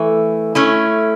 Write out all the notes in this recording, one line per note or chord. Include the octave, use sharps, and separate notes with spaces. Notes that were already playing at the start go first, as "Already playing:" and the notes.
Already playing: E3 A3
A3 C#4 E4